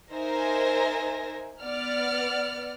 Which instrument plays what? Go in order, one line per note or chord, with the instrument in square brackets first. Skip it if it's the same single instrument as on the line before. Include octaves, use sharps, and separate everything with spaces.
[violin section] D#4 A#4 C5 E5 G#5 A#6
B3 D5 F#5 F6